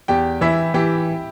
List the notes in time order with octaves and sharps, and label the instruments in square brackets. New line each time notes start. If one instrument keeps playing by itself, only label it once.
[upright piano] E2 [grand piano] G4 G5
[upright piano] E3 [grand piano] E4 E5
[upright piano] E3 [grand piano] G4 G5